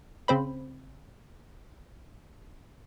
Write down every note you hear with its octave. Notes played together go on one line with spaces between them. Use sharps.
C#3 C4 C5 B5